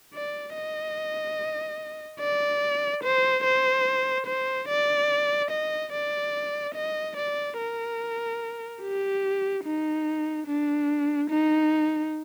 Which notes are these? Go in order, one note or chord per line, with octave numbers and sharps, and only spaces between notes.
D5
D#5
D5
C5
C5
C5
D5
D#5
D5
D#5
D5
A#4
G4
D#4
D4
D#4